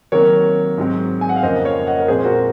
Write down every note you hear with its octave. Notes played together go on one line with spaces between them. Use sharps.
C3 D#3 F#3 A#3 A#4 C#5
G#2 F#3 C4
G#5
F#5
F5
F2 C#3 F3 A#3 C5 D#5
C#5 F5
D#5 F#5
A#4
A#2 F3 G#3 C4 G#4 C5
C5
F#4 A#4